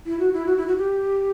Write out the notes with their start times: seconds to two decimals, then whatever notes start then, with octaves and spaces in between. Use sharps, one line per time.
0.06 E4
0.19 F#4
0.33 E4
0.46 F#4
0.57 E4
0.67 F#4
0.77 G4